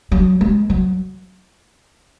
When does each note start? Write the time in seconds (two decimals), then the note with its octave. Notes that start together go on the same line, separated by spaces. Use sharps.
0.12 F#3
0.41 G#3
0.70 F#3